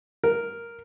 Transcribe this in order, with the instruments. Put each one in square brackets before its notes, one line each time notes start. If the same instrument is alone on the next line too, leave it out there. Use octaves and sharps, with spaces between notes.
[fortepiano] A#4